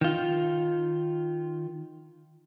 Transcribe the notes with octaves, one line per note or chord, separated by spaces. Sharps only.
D#3 F4